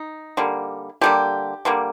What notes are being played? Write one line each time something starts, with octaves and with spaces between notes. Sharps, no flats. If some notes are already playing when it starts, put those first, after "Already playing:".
Already playing: D#4
D3 G3 A#3
D3 G3 A#3 G4
D3 G3 A#3